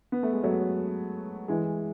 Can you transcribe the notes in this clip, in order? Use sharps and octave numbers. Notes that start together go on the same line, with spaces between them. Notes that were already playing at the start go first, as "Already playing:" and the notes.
B3
A3
G#3
F#3 A3
E3 G#3